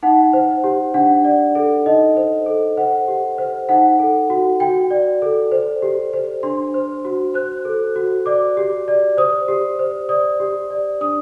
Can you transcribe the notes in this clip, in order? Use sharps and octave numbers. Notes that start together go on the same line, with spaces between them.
D#4 F#5
C5
G4
D4 F#5
D5
A4
D#4 D#5
C5
A4
C5 F#5
G4
C5
D#4 F#5
A4
F#4
F#4 G5
D5
A4
C5
G4
C5
D4 C6
C5
F#4
C5 F#6
A4
F#4
D5 D6
G4
D5
C5 D#6
G4
C5
D5 D#6
G4
D5
D4 D#6